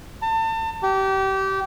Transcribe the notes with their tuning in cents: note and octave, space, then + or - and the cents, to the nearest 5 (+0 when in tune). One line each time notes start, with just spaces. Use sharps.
A5 +35
G4 -25